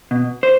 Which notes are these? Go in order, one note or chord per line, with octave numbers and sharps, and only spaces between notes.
B2
C5